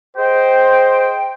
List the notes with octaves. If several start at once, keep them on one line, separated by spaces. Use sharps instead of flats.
G#4 C5 D#5 G5